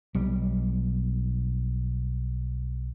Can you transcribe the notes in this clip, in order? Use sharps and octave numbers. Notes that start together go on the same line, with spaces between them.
B1 G3